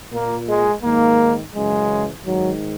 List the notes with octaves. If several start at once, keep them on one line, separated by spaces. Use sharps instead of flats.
A#2 A#3
G#3
G#2 D#3 A#3
F#2 C#3 E3 G#3
G#2 D#3 F#3